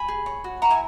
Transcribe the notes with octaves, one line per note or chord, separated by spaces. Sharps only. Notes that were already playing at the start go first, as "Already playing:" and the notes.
Already playing: G#5 B5
G#4
C#5
F#4
E4 F#5 A#5
E5 G#5